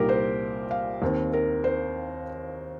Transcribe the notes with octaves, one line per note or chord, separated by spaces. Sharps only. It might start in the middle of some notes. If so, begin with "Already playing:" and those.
Already playing: C2 A#2 G3 A#3 D#4 G4 A#4
C5
F5
D#2 D#3 C4
A#4
C5